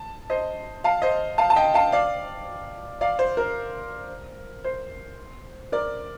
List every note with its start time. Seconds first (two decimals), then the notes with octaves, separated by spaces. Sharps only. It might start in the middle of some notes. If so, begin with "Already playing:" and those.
Already playing: A5
0.30 C5 D#5
0.84 F5 A5
1.02 C5 D#5
1.38 F5 A5
1.50 A5
1.56 D#5 G5
1.74 F5 A5
1.92 D5 F5
3.01 D5 F5
3.19 C5
3.37 A#4
4.64 C5
5.72 A#4 D5